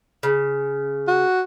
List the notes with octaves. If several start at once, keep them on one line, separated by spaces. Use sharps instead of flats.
C#3
F#4